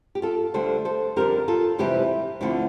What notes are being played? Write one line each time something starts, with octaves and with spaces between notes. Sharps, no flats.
G4
F4 A4
D2 D3 G3 A4 C5
A4 C5
F2 D3 G3 G4 A#4
F4 A4
F2 C3 E3 G3 E4 G4
D2 D3 F3 C4 E4